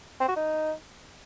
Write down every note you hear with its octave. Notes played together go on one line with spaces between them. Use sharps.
C4
F#4
D#4